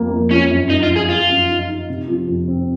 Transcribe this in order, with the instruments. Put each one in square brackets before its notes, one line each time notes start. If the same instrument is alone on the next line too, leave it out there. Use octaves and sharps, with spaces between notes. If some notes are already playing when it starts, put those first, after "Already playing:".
Already playing: [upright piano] F2 A#3
F2
[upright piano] F3 [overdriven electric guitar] C#4
[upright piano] F#2
[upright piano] F#2 [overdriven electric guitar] D#4
[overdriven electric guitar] F4
[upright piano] F3
[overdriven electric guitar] G#4
[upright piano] F3 [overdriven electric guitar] F4
[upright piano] F#2
D#4
D#4
C3
F3
F2
C4